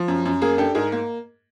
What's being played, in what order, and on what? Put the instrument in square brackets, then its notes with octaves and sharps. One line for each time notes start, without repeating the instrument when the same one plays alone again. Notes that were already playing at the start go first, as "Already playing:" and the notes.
Already playing: [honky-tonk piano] F3
F#2
F#2
A#3 G#4 A#4
D4 G4 A4
G#2 G#4 A#4
A#3